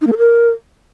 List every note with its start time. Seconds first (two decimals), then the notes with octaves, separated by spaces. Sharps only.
0.01 D#4
0.07 A#3
0.12 A4
0.18 A#4